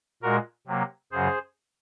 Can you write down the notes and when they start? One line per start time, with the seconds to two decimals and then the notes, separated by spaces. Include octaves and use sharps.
0.22 A#2 G#3 F#4 A#4
0.67 C3 F#3 A#3
1.12 F#2 C#3 F#3 G#4 C5